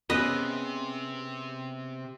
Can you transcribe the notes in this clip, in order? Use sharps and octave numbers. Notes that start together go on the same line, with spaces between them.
C3 B3 C#4 G#4 B4 D#5